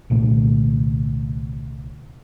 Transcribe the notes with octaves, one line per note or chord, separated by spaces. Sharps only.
C2 A#2 D3 A3